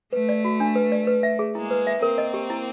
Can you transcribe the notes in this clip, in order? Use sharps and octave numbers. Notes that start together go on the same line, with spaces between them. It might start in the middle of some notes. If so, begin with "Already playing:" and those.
A3 B4
D5
F#4
D4
B4
D5
B4
E5
G#4
G#3 A#3 E4
B4
E5
A#3 C4 A#4
D#5
G4
E4